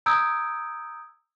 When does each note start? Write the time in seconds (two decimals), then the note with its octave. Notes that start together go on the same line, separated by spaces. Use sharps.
0.06 A#5 D#6 E6 G6 G#6 D7